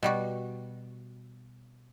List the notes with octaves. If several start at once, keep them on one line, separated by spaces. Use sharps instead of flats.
B2 G3 F#4